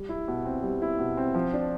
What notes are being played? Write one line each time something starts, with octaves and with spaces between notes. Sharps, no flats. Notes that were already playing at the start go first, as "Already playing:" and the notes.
Already playing: G3
E4
B2
C4
G3
E4
B2
C4
F3
D4